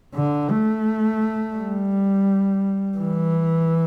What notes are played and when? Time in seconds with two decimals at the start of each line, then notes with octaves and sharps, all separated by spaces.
0.14 D3
0.50 A3
1.56 G3
2.98 E3